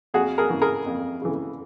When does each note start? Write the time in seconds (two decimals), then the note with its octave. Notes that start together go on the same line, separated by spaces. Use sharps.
0.14 F2 F#4 G#4
0.38 G#4 A#4
0.50 C#3 E3
0.61 G#4 A#4
0.86 F2
1.22 C#3 E3